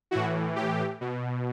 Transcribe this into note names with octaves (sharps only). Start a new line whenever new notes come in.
A2 E3 F#4
G4
B2